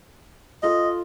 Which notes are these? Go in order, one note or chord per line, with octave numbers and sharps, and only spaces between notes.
F4 A4 D#5